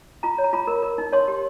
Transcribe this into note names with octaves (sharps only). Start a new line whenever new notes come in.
F4 A#5
C#5
A#5
F4 B5
A#4
A#4
D#4
C#5 C6
G4